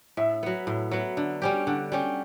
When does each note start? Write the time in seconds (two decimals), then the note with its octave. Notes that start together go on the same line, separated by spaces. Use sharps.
0.17 A2 E5
0.43 F#3 B3
0.67 A2
0.91 F#3 B3
1.17 D3
1.42 G3 C#4 G4
1.67 D3 F#5
1.92 G3 C#4 G4